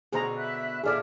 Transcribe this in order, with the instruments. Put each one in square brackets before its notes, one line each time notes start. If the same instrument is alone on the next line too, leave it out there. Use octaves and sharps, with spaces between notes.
[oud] B2 D3 [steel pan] G#4 C5 A#5
[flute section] E5 B5 F#6
[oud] E2 A#2 D3 [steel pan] G#4 A4 D5 [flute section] E5 F6